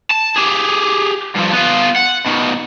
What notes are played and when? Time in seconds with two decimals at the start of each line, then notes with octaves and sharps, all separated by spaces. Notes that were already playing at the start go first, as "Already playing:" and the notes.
0.11 A5
0.36 G4 G#4
1.36 G2 F3
1.53 B3 F4
1.96 F#5
2.26 B2 D#3